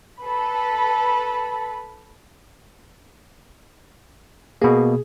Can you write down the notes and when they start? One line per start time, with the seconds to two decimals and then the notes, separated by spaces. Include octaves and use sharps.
0.20 A4 B4 B5
4.62 B2 A#3 G#4